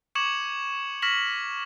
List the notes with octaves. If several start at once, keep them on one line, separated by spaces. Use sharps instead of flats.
C#6 D6 G#6 C#7 E7 F#7
C#6 F6 A#6 B6 E7 F#7